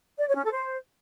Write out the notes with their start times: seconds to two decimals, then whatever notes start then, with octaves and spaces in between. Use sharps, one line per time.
0.19 D5
0.27 C#5
0.36 C#4
0.44 A4
0.52 C5